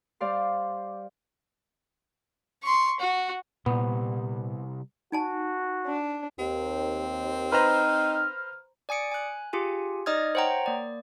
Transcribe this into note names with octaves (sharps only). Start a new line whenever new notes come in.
G3 C5 D5 F5 C6
C6 C#6
F#4
C2 A#2 B3
D#4 F#4 G#5 A5
D4
D#2 C4
D#4 B4 C5 A#5 F6
D5 G#5 D#6 C#7 D7
G#5 F#6
F4 G4 G#4 G#5
D#4 D5 D#5 D#6 F6 G#6
C5 C#5 F#5 G5 A#5
A#3 D5